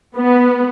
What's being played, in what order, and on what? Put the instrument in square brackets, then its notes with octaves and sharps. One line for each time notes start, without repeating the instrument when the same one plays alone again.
[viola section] B3